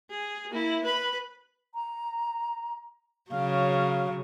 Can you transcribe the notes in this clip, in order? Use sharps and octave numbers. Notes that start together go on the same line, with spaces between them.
G#4
A#3 E4
B4 B5
A#5
C#3 F#3 F5